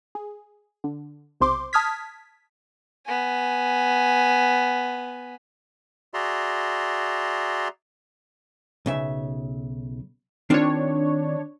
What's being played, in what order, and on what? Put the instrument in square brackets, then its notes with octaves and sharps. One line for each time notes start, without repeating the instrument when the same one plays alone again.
[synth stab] G#4
D3
B1 C3 C5 C6 D6
A5 D#6 F6 G#6 B6
[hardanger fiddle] B3 G#5
[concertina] F#4 G#4 D5 E5 A#5 C6
[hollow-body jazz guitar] B1 C#3 E5
[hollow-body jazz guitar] D#3 C4 F4 [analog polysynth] D4 C#5